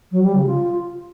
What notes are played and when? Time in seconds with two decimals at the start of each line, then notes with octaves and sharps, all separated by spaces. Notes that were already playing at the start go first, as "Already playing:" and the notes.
0.12 F#3
0.23 G3
0.35 C#3
0.47 F4